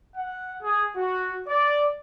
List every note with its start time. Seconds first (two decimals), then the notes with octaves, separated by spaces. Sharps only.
0.15 F#5
0.61 G#4
0.95 F#4
1.46 D5